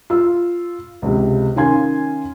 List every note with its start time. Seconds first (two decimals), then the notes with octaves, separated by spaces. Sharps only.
0.10 F4 E6
1.02 C#2 C3
1.56 D#3 C#4 F5 G#5 C6 G#6